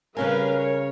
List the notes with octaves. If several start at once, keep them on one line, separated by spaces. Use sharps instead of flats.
C#3 G3 C#4 A#4 B4 F5 G#5
C#5